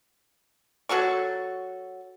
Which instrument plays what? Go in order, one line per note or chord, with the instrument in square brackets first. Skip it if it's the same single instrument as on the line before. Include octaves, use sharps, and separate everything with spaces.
[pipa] F#3 F#4 A4 C#6